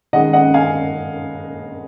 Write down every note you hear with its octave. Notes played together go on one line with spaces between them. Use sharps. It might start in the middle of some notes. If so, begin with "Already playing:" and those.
D#3 G#3 D#5 F#5
D#5 F#5
F5 G#5